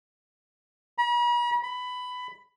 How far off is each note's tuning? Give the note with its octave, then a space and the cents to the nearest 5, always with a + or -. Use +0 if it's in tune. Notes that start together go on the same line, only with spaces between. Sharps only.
B5 -45
B5 +15